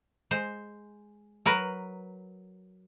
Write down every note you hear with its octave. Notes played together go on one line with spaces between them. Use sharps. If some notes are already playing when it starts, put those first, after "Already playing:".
G#3 C5
F#3 A#4 B4